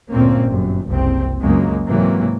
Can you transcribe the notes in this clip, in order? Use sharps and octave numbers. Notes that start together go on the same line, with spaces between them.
D2 G2 A#2 A#3 C4 C#4
G1 F#2
F#1 C2 C4
C#2 F#2 C#3 F#3 G#3 A#3
G#2 C3 E3 F#3 A#3